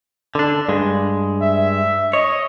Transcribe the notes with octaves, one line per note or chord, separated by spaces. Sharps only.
D3 D4
G2 G#3
E5
C#5 D#5